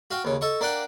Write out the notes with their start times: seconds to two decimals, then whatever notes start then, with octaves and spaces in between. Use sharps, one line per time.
0.11 F#4 F5 G5
0.25 D#2 C#3
0.41 A4 D#5 C#6
0.61 A#3 D4 D5 F#5 G5